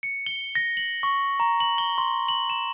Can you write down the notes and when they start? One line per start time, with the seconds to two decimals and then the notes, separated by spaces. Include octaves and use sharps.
0.03 C#7
0.26 G7
0.55 A#6
0.77 F#7
1.03 C#6
1.40 A#5
1.60 F#7
1.78 G7
1.98 C6
2.28 F#7
2.50 E7